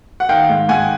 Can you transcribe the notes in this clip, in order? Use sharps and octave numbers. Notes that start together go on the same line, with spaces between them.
F#5
D#3 F5 G5
G#2
G#2 F#5 G#5